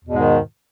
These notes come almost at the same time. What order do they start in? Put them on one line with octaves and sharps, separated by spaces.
E2 B2 G#2 G#3 D#3